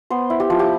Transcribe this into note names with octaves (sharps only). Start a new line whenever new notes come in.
B3 C5
E4
G4
F3
G4